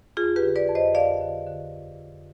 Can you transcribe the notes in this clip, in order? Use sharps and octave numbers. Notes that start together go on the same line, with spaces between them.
F2 F4 G#4
G4 B4
D3
B4 D5
F2
C5 D#5
F2 D5 F5
D3
D3